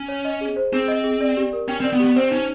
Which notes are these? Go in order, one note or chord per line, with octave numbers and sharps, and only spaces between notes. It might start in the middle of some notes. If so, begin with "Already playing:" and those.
Already playing: C#4
C#5
D#5
G#4
C5
C4 G#4
D#5
G#4
D5
G4
A#4
C#4 G5
C4 D5
B3
G4
B3
C4 C5
C#4 D#4